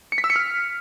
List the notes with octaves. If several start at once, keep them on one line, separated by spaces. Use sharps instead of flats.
C#7
B6
E6
C#7
F6